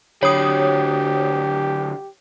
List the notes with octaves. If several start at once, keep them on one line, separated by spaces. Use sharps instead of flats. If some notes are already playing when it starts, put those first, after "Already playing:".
D3 F#3 G4 C#5 D#6